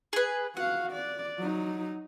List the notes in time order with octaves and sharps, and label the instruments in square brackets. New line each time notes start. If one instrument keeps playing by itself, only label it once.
[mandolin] G#4 B4
[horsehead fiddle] F#4 F5 [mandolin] F#5
[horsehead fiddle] D5
F#3 D#4